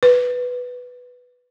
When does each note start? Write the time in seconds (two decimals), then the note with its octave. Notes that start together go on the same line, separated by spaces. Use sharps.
0.03 B4